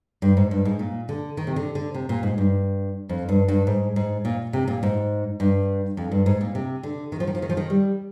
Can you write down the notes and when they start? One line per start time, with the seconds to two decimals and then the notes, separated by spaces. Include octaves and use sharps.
0.22 G2
0.37 G#2
0.51 G2
0.65 G#2
0.79 A#2
1.09 D3
1.37 D#3
1.47 C3
1.56 D3
1.75 D3
1.94 C3
2.09 A#2
2.23 G#2
2.38 G2
3.09 F2
3.29 G2
3.48 G2
3.67 G#2
3.96 G#2
4.25 A#2
4.53 C3
4.68 A#2
4.83 G#2
5.40 G2
5.97 F2
6.11 G2
6.26 G#2
6.41 A#2
6.55 C3
6.83 D3
7.12 D#3
7.20 F3
7.27 D#3
7.35 F3
7.42 D#3
7.49 F3
7.57 D#3
7.70 G3